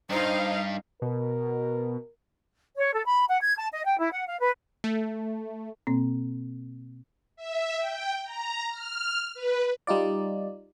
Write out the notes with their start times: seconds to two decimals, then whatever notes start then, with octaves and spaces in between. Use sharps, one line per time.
0.10 G2 D#4 C5 F5
1.02 B2 A#4
2.77 C#5
2.94 A4
3.06 B5
3.29 F#5
3.42 G#6
3.58 A5
3.72 D#5
3.85 G5
3.99 E4
4.12 F#5
4.27 F5
4.40 B4
4.84 A3
5.87 B2 A#3 C4
7.36 E5
7.77 G5
8.23 A#5
8.69 F6
9.34 B4
9.87 G3 D#4 F4 D5